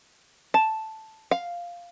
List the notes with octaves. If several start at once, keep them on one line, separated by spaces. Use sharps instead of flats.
A5
F5